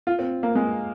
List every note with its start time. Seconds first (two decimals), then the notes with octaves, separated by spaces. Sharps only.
0.07 F4
0.19 C4
0.43 A#3
0.55 G#3